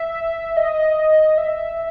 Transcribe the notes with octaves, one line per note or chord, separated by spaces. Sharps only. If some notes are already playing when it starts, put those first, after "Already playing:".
Already playing: E5
D#5
E5